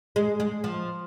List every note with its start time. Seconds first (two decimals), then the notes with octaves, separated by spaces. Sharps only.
0.16 G#3
0.40 G#3
0.64 F3